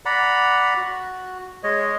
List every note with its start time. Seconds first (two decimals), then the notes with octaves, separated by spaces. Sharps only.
0.05 D5 F#5 A#5 B5
0.77 F#4
1.63 G#3 C#5 D#5